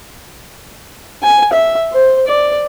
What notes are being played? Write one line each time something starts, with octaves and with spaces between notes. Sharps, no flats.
G#5
E5
C5
D5